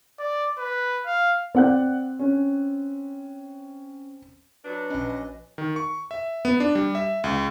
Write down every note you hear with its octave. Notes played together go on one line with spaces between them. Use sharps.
D5
B4
F5
C4 D5 F#5 F#6
C#4
F#3 D4 B4
A#1 C#4 D#5
D#3
C#6
E5
B3
D4
G3
E5
C#2